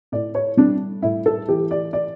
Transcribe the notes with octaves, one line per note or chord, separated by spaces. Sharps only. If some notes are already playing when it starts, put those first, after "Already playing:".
A2 D5
C#5
G3 D4
A2 E4
A4
E3 G4
D5
D5